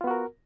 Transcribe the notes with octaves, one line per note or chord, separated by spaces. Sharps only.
B3 F4 F#4 A#4